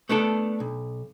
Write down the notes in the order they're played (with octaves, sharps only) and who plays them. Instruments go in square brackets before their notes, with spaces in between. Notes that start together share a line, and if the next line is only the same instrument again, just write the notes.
[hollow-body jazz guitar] A3 B3 D4 A4
B1